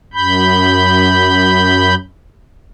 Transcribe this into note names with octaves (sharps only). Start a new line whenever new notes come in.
F#2 B5 G6